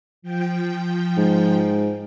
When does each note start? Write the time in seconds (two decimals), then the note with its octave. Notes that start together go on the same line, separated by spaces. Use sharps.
0.22 F3 G5
1.17 G#2